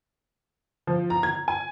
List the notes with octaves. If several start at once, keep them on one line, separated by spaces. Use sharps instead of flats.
F3
A#5
G#6
G#5